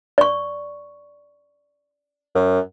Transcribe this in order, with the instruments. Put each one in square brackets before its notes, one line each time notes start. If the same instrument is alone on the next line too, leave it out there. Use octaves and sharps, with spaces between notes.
[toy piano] D5 C#6
[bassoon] F#2